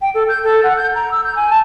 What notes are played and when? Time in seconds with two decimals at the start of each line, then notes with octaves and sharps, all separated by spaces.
0.01 G5
0.14 A4
0.28 G6
0.43 A4
0.63 F#5
0.76 G6
0.95 A#5
1.11 E6
1.24 G6
1.35 G#5
1.49 A5